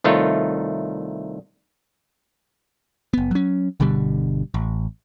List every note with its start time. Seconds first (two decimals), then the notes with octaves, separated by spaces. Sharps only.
0.04 C2 D#3 A3 F4 C#5
3.13 F#1 B3
3.31 F#3 C#4
3.80 G1 B2 D3 G3
4.54 A1